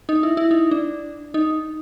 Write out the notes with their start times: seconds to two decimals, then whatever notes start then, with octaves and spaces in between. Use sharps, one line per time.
0.09 D#4
0.23 E4
0.37 E4
0.51 D#4
0.71 D4
1.34 D#4